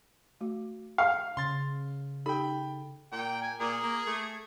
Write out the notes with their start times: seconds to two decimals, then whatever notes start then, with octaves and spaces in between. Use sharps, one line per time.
0.41 A3 F#4
0.98 F5
1.37 C#3 C6 A6
2.26 D#4 G4 A4 G5 B5
3.12 A#2 G5
3.42 G#5
3.60 A#2 G#4
3.83 A#3
4.07 A3